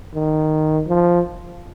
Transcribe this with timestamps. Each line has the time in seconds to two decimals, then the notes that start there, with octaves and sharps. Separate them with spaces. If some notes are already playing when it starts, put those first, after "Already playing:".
0.15 D#3
0.88 F3